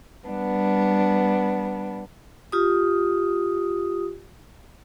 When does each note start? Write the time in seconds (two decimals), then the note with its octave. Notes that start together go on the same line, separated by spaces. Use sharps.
0.28 G3 B3 D4
2.52 F4 G4 D#6